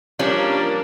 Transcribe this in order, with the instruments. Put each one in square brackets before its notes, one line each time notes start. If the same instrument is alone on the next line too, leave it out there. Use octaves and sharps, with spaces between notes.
[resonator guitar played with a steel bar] F3 G3 C#4 [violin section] A#3 D4